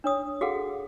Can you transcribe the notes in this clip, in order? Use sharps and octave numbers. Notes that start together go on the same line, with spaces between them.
D4 C#5 D#6
F#4 G#4 A4 F5 F#5